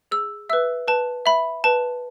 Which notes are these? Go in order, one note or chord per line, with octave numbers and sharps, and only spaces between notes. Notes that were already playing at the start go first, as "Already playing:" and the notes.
G#4 E6
B4 E5 E6
B4 A5
E5 B5
B4 A5